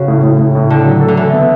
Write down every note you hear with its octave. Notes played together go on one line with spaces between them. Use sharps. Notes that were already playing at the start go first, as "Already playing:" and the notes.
Already playing: C#3 F#4
A2
A2
A2
A2
D3 A4
F#3
A4
D3
E3 A4
B3